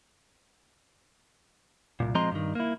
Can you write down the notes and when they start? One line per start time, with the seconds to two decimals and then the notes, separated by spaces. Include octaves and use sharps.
2.00 C2 F#2 A#2
2.15 F3 G#3 C4 D#5 A#5 C6
2.32 G2 D#3
2.55 A#3 E4